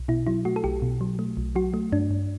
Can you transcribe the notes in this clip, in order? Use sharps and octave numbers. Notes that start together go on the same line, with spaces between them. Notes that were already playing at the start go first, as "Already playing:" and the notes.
Already playing: B1
B2 E4
F#3 E4
A3 F#4
A4
B1 G4
B2
F#3
A3
B1
F#3 F#4
A3
G2 D4
G2